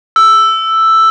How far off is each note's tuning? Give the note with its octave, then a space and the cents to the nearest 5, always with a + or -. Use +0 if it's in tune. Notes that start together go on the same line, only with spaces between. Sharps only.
E6 +5